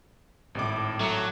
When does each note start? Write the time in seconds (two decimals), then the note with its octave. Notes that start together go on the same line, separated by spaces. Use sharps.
0.55 G#1 A2 D6
1.00 F#3 A3